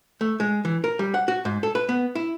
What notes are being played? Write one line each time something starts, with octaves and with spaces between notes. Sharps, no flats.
A3
G#3
E3
A#4
G3
F#5
F#4
G#2
A4
B4
B3
E4